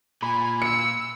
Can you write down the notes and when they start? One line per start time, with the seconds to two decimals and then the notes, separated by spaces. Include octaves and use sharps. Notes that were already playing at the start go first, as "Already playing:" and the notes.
0.22 A#2 G#5 B5
0.62 E6 C#7